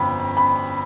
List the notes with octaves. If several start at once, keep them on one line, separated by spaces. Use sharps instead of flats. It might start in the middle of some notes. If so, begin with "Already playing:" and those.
Already playing: G1 F2 G5 B5
B5